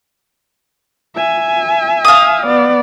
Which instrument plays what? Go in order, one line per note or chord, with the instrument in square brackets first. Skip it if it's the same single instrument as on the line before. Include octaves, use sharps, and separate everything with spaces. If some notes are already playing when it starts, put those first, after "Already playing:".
[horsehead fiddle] E5 G#5
[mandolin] F5 D#6
[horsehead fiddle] B3 D5